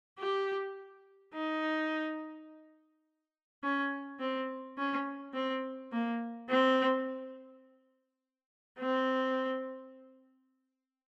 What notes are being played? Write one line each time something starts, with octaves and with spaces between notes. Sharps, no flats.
G4
D#4
C#4
C4
C#4
C4
A#3
C4
C4